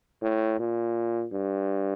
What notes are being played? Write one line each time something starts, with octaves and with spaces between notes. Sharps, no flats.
A2
A#2
G2